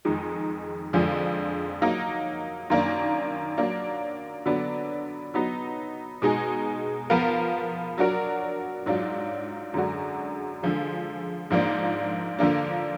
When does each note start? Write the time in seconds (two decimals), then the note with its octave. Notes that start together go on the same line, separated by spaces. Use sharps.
0.05 F2 D#3 G#3 D#4
0.93 F2 D3 F3 G#3 D4
1.82 F#3 A#3 D#4
2.70 F#2 D#3 A#3 D4
3.58 F#3 A#3 D4
4.45 D3 F#3 B3 D4
5.34 F#3 B3 D#4
6.22 B2 G#3 D#4 G#4
7.10 F3 B3 F4 A#4
7.98 F#3 D4 F#4 A#4
8.86 G#2 F#3 D4 F4
9.74 F#2 D3 G#3 D4 F#4
10.63 D3 F3 G#3
11.50 G#2 F3 A#3 D4
12.39 D3 F3 A#3 D4